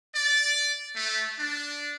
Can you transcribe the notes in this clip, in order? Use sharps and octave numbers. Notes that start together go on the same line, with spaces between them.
D5
A3
D4